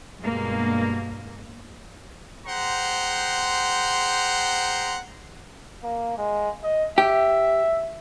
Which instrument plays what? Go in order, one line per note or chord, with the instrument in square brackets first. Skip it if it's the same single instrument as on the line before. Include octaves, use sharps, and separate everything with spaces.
[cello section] G2 B2 G#3 A#3
[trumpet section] G#4 C5 F#5 G5 A#5 C6
[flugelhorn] A#3
G#3
D#5
[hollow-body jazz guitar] G4 [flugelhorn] E5